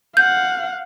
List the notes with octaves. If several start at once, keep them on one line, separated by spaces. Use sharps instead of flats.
F5 F#5 G6